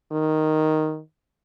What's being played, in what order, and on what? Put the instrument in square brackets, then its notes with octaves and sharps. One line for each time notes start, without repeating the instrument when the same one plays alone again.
[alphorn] D#3